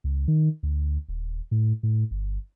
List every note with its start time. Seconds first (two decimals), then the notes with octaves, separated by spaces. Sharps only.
0.04 C#2
0.28 D#3
0.63 D2
1.09 D#1
1.51 A2
1.83 A2
2.11 G1